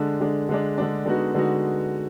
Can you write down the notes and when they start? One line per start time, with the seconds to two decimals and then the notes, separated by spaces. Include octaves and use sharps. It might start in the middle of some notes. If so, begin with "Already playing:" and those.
Already playing: D3 G#3 D4
0.20 D3 G#3 D4
0.49 D3 G#3 D4
0.78 D3 G#3 D4
1.06 D3 G#3 B3 D#4 F#4
1.34 D3 G#3 B3 D#4 F#4